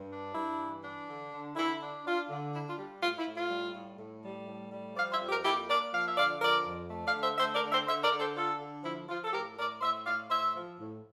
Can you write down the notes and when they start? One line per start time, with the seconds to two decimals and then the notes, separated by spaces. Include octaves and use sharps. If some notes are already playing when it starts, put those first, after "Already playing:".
Already playing: G2
0.11 D4
0.34 G2 E4
0.59 E3
0.83 D4
1.08 D3
1.32 D3
1.56 D3 E4
1.81 D4
2.05 D4 F4
2.28 D3
2.53 D4 E4
2.70 F4
2.78 G3
3.01 A2 F4
3.18 E4
3.27 A2
3.34 F4
3.51 G3
3.75 A2
3.98 A2
4.23 G3
4.48 A2
4.71 G3
4.96 F3 D5 F5
5.12 C5 E5
5.20 F2
5.28 G4 A#4
5.44 A#3 E4 G4
5.69 A#3 A#4 D5
5.92 F3 F5
6.05 E5
6.17 D3 D5 F5
6.41 F3 A#4 D5
6.66 F2
6.90 A3
7.06 D5 F5
7.15 D3
7.22 C5 E5
7.38 A3 C5 E5
7.54 A#4 D5
7.63 D3
7.71 C5 E5
7.87 D3 C5 E5
8.03 A#4 D5
8.11 D3
8.19 A4 C5
8.36 D4 F4 A4
8.60 D3
8.84 F3 E4
9.09 F3 F4
9.24 A4
9.33 A2 G4 A#4
9.58 A2 A#4 D5
9.81 A2 C5 E5
10.06 A2 D5 F5
10.30 A2 C5 E5
10.54 F3
10.79 A2